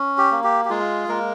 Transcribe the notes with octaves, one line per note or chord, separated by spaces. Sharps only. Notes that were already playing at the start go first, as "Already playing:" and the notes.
Already playing: C#4
G4
A#3
G4
G4
G#3 F4 G#4
G#3 A#3 A#4